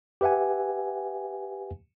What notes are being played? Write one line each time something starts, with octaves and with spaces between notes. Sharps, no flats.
G4 B4 E5 F#5 G#5